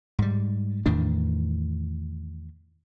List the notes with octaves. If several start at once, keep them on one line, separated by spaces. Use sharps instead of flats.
G#2 G3
E2 A2 D#3 D4